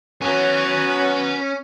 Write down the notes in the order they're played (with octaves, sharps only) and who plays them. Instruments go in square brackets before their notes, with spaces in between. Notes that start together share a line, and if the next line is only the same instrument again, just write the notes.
[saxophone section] F#3 B3 [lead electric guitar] C#4 [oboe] F#4 [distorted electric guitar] B4 G#5